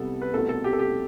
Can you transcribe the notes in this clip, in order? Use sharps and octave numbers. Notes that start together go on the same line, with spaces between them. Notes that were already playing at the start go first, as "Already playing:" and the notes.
Already playing: C2 C3 G3 B3 A4
B4
C2 B2 A3 C4 A4
A4
G4
A4
G4